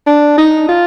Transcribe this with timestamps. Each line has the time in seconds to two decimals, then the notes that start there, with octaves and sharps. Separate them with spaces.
0.07 D4
0.37 D#4
0.68 F4